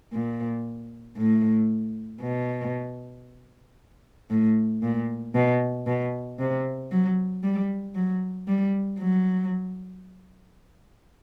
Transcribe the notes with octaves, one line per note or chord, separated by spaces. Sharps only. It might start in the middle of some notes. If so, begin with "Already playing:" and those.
A#2
A2
B2
A2
A#2
B2
B2
C3
F#3
G3
F#3
G3
F#3